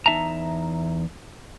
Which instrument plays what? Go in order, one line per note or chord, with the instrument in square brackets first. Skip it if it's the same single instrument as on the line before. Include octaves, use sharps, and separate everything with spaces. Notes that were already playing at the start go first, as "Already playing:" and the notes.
[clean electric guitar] E2 D#4 E5 A5 A#5